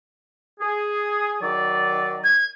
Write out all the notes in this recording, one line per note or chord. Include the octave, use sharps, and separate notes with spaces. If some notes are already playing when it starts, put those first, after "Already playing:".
G#4
D#3 F#3 D5
G#6